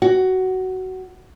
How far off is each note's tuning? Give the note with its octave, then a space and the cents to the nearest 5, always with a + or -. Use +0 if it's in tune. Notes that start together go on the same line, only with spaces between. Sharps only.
F#4 +15